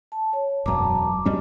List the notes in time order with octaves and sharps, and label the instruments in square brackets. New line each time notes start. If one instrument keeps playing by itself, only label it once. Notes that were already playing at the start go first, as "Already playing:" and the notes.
[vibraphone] A5
C#5
[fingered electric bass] E1 F#2 [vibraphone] A5 A#5 D6
[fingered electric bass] F#2 G3 C#4 [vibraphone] D#5